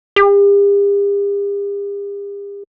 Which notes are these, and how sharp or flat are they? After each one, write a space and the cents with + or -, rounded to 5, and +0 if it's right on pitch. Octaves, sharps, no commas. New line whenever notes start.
G4 +45